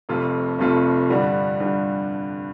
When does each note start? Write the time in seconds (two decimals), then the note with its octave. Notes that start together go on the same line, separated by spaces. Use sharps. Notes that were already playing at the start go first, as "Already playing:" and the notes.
0.09 F1 F2 C3 A3 F4
0.59 F1 F2 C3 A3 F4
1.10 G2 D3 G3
1.60 G2 D3 G3